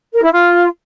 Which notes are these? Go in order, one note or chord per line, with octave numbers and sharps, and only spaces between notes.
A#4
E4
F4